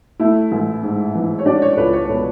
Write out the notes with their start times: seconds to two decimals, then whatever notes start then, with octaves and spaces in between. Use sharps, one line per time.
0.20 A3 E4 E5
0.52 A1
0.83 G#2
1.15 E3
1.39 C#5
1.46 C#4 D4 D5
1.62 C#5
1.77 C#2 B4
1.93 C#5
2.09 B2 B4